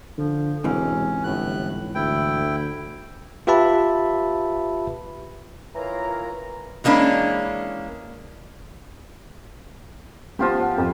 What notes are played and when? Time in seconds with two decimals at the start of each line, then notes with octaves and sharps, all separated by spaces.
0.18 D3 F3
0.64 E1 G#2 C3 E3 C#4
1.24 G1 A2 F#6
1.95 D2 E4 G5
3.47 F4 G4 B4 E5 A5 B5
5.75 E3 F4 A#4 C#5 A#5
6.84 E3 G#3 A#3 C#4 D4
10.39 F3 B3 F4 G4 C5
10.61 F#5
10.78 F2